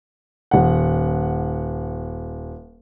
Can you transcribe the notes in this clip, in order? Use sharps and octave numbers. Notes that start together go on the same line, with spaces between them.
D#1 F#5